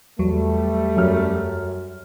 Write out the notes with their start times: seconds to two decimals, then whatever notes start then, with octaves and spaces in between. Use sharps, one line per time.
0.19 E2 F#3 G3 A3
0.96 F#2 F6